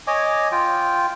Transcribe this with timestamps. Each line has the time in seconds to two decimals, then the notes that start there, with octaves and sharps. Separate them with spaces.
0.07 C#5 D#5 G#5 D6
0.52 F4 G5